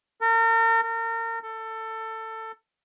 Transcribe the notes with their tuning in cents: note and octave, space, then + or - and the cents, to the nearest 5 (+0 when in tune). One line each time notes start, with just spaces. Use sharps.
A#4 -40
A#4 -35
A4 +20